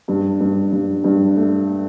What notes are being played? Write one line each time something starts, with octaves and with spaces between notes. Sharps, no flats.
G2
G2
G2
G2
A3